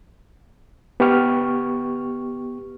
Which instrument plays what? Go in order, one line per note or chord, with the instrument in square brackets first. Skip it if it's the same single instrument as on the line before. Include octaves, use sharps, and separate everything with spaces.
[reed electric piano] B3 G4 C#6 F6